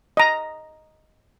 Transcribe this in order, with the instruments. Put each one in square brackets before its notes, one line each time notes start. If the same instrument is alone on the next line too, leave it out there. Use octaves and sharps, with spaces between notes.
[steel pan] D#5 A#5